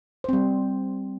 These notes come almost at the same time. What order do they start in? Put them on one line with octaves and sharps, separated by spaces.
C5 C4 G3